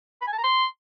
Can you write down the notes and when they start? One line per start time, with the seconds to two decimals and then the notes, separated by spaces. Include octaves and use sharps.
0.22 B5
0.27 G#5
0.33 A5
0.38 A#5
0.44 C6